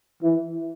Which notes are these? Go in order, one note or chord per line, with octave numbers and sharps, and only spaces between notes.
E3